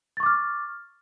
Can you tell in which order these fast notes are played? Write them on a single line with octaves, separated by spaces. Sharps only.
A6 C#6 D6 F6